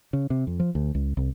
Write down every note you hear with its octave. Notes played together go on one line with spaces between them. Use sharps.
C#3
C3
F2
F3
D2
C#2
C2